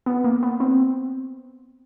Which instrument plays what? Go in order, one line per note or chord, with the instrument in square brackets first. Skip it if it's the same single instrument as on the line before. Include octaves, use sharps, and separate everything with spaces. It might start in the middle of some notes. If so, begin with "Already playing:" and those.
[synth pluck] B3
A#3
B3
C4